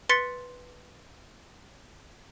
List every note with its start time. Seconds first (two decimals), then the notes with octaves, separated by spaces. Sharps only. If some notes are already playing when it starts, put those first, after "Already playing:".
0.09 B4 C6 A6 B6 C#7